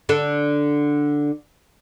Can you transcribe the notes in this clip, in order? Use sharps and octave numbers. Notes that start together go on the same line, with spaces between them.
D3 D4 A4